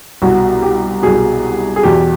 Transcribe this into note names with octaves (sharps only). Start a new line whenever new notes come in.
C2 B2 F#4
G4
C2 B2 G#4
G#4
E2 B2 G4